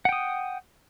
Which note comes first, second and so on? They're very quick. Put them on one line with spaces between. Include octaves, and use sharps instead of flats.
F#5 G5 D#6